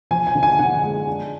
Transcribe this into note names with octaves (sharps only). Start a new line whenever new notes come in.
F3 G#5
G#5
D3
G#5
D3 F#5
G#3
D4